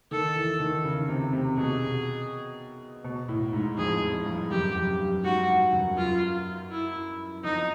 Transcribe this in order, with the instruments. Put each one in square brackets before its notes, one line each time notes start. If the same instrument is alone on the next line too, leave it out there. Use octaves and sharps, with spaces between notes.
[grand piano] D#3 [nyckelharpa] A4
[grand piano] E3
D#3
C#3
C3
C3
[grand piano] B2 [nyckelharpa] G#4
[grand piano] B2
A2
G#2
[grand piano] F2 [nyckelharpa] G#4
[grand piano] F2
G2
[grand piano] F#2 [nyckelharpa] G4
[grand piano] F#2
G2
[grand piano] G#2 [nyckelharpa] F#4
[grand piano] G2
F#2
[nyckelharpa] F4
E4
[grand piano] F2 [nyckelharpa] D#4